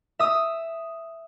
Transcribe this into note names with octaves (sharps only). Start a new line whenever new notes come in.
E5 D#6